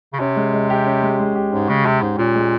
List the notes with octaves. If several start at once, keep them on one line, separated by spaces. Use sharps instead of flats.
C#3
C3 C#4
G#3
G#3
G4
C#4
G#3
G#3
G4
G#2 C#4
C#3 G#3
C3 G#3
G#2 G4
A#2 C#4
G#3